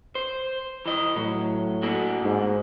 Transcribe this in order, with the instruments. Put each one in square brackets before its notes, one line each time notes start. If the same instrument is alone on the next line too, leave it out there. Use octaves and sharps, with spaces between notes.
[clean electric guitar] C5
E3 D#5
[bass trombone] A2 [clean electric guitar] F#3
[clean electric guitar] D3 A#3 F#4
[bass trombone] G#2